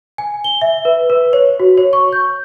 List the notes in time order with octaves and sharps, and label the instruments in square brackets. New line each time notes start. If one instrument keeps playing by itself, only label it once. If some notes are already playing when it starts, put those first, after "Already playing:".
[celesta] G#5
G7
E5
B4
B4
C#5
F#4
C#5
C#6
G6